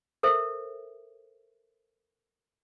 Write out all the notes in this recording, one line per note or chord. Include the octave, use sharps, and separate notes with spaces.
A4 A#4 C5 E5